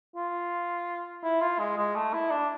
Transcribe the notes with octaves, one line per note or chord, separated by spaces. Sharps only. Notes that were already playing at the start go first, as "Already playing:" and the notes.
F4
E4
F4
G#3
G#3
A3
E4
D4